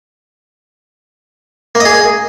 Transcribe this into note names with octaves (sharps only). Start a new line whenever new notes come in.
A#3
D#5
G#4